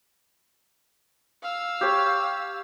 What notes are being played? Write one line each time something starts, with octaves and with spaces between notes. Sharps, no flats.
F5 E6
G4 C#5